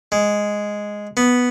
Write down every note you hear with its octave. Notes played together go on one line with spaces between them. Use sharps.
G#3
B3